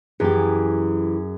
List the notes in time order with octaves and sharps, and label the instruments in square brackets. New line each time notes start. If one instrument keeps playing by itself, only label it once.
[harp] F#2 [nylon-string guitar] E3 G4 [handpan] G#4